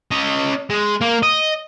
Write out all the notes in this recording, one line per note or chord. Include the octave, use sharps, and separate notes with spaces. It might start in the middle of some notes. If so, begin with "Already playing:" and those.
C#4 D#5
G#3
A#3
D#5